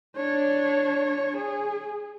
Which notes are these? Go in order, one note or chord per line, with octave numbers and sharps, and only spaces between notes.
D4 C#5
G#4